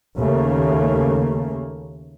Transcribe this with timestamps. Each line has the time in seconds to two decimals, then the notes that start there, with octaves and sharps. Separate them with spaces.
0.18 D#2 C#3 A3 A#3